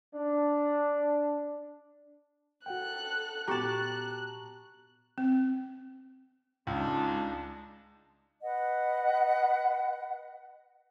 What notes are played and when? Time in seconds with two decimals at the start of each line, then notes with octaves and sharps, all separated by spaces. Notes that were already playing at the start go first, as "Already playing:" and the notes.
0.15 D4
2.66 F#4 A4 F#5 G5 F#6
3.48 A#2 B3 F#4 G4 A5 A#5 C#6 F#6
5.18 C4
6.67 C#2 G#3 D4 D#4
8.42 B4 D#5 F#5